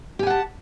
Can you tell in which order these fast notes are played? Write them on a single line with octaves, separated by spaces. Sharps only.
G4 G#5 F#5 A5